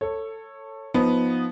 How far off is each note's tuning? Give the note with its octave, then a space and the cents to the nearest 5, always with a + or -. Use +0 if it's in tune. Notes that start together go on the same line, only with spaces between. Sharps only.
A4 +15 C#5 -10
F3 +5 B3 +0 D#4 +0